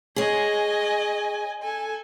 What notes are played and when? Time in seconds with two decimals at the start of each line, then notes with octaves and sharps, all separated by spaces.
0.16 G#4 C#5 D#5 G#5
1.62 A4 G#5